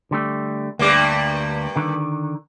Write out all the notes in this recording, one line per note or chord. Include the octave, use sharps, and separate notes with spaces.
D3 G3 A3
D2 G2 G3 A#3 D5
D3 D#3